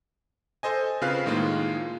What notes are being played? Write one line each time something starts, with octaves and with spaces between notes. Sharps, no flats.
A4 C5 D#5 G#5
C#3 C4 F4 B4 F5 F#6
A2 D#3 G#3 A#3 F4